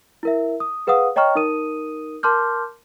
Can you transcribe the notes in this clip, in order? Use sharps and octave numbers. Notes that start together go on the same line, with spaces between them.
E4 A#4 E5
D#6
G#4 B4 F5 F#5 D#6
C#5 D#5 G5 A#5 C#6 F6
D#4 A#4 D#6 D#7
A#4 A5 C6 D6 F6 G6